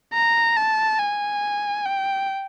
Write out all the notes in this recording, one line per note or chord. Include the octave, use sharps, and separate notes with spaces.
A#5
A5
G#5
G5